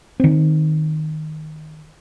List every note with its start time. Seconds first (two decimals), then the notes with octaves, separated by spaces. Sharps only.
0.20 D#3 C4